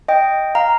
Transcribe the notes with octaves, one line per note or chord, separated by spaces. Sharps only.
D#5 G5
F5 A#5